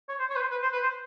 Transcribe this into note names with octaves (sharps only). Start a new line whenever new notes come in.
C#5
C5
C#5
B4
C5
B4
C5
B4
C5